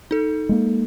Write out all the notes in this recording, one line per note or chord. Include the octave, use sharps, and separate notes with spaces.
D#4 A4
G#3 A#3